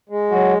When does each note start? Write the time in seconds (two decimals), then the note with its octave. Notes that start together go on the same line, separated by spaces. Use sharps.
0.09 G#3
0.31 F#3 F#4